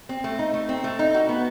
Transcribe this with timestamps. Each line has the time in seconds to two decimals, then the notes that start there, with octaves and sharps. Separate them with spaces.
0.09 C4
0.24 A3
0.39 D#4
0.54 A3
0.69 C4
0.84 A3
0.99 D#4
1.14 F#4
1.29 B3